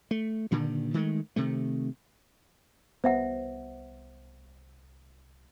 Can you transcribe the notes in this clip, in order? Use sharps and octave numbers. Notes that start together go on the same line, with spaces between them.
A3
G2 A#2 D3 D#3
D#3 G#3 A3
C3 D#3 A3
C2 B3 C5 E5 F#5